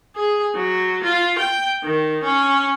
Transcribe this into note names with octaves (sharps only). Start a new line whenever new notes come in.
G#4
F#3
F4
G5
D#3
C#4